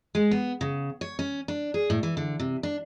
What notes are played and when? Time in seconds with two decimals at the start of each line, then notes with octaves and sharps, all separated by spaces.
0.15 G#3
0.31 B3
0.61 C#3
1.01 C#5
1.19 C#4
1.48 D4
1.74 G#4
1.90 A2
2.03 E3
2.17 D3
2.40 C3
2.63 D4